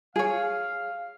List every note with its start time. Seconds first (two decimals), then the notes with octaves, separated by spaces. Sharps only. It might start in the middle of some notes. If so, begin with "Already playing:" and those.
0.16 G#4 C#5 F5